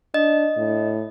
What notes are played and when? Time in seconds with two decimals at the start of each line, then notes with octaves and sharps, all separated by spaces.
0.14 D4 D#5
0.57 A2